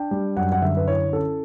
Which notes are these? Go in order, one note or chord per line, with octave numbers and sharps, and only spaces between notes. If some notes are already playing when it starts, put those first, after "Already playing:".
Already playing: D4 G5
G3
F#2 F#5
F#5
D3 E5
B4
E4 C#5
C#4 A4